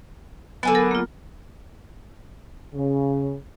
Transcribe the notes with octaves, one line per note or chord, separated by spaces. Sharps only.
D3 F#3 B3 G#4 B4
A#4 A6
A#3 F4
C#3